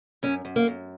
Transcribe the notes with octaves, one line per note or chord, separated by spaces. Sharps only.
F#2 C#4
F#2
A#3
F#2